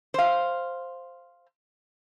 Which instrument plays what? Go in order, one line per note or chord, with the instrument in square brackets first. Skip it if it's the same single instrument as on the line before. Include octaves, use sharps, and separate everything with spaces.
[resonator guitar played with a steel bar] C5 F5